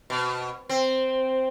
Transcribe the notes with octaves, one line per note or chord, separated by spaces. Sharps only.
B2
C4